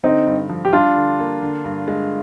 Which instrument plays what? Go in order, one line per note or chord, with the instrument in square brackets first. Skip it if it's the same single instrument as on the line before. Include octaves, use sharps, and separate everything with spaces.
[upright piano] D3 [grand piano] C4 D#4
[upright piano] G2
F3
[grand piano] G4
[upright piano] G3 [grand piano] D4 F4
[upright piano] D3
A#3
D3
G2
G#3